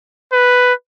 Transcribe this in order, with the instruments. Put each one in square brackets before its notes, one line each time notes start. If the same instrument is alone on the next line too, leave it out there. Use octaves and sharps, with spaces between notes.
[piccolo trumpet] B4